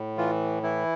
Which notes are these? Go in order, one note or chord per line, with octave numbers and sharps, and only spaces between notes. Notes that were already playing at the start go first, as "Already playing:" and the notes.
Already playing: A2
E3 F4
E3 E4